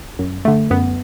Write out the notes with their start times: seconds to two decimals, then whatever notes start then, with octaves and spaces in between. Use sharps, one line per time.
0.19 F#2
0.45 D3 A3
0.70 F#2 B3